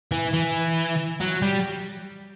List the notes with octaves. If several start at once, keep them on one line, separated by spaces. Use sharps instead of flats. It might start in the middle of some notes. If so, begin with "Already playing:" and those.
E3
E3
F#3
G3